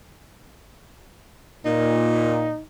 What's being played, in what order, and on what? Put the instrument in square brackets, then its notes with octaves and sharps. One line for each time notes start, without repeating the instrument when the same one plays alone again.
[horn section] A#2 [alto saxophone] D#4